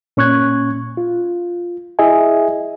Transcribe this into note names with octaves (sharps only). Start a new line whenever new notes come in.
A#2 C#4 C#6 F#6 G#6
F4
E4 G#4 D#5 E5 G#5